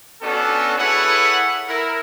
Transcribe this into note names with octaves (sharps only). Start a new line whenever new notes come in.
B3 C#4 D4 F#4 A4
E4 G#4 A4 B4 C#5 F#5
E4 A#4